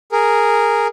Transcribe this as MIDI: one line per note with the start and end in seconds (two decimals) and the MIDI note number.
0.12 0.87 68
0.12 0.87 70